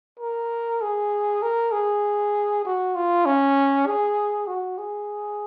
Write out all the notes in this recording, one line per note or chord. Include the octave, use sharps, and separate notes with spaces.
A#4
G#4
A#4
G#4
F#4
F4
C#4
G#4
F#4
G#4